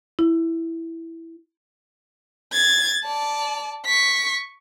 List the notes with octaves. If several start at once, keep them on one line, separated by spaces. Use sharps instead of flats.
E4
G#6 A6
D5 A5
C#6 B6